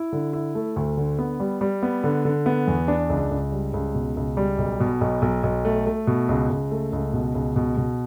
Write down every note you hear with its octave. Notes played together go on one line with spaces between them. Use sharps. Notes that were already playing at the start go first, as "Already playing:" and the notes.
Already playing: E4
D3
E4
A3
D2
D3
B3
G3
G3
B3
D3
D3
B3
E2
D4
C#2
C#2
G3
C#2
B2
C#2
G3
B1
B2
B1
B1
B1
A3
A3
B2
C#2
C#2
A3
C#2
B2
C#2
B2
B2